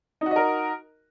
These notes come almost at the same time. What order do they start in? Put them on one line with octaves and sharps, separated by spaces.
D#4 F#4 D#5 A#4